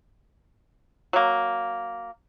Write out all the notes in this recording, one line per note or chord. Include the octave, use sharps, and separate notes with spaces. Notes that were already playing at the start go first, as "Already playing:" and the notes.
F#3 A#3